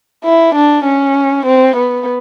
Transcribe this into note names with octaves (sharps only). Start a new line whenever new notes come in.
E4
D4
C#4
C4
B3